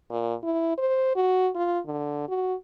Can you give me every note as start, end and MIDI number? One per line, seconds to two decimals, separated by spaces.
0.11 0.34 46
0.43 0.74 64
0.78 1.14 72
1.16 1.50 66
1.56 1.79 65
1.86 2.25 50
2.28 2.55 66